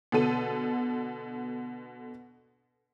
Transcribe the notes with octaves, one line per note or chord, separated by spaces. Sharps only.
B2 D3 A4 D#7